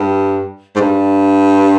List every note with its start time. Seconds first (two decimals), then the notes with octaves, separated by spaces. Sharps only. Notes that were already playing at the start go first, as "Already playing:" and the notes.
Already playing: G2
0.76 G#2
0.80 G2